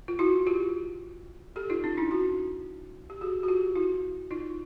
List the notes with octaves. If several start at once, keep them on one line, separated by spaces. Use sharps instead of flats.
F4
E4 F#4
F4 G4
G4 A4
D#4 F4
C#4 D#4
D4 E4
E4 F#4
G4
F#4 G#4
F#4
F4 G4
E4 F#4
D#4 F4